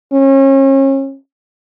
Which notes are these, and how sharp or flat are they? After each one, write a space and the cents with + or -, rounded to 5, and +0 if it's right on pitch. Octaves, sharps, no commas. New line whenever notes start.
C#4 -35